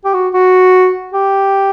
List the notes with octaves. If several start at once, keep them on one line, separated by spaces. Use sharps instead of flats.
G4
F#4
F#4
G4